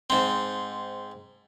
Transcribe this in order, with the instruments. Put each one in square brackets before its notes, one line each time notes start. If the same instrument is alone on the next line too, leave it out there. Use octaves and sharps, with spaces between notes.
[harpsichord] G#2 C4